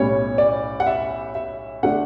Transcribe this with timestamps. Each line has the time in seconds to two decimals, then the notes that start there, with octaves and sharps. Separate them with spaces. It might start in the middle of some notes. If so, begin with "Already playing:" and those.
Already playing: B1 A2 G3 C#4 C#5
0.38 D5
0.80 F#5
0.87 E5
1.35 E5
1.83 D3 A3 D4 F#5